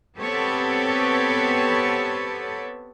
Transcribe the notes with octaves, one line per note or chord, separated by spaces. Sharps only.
B3 C4 G4 A4 B4 C#5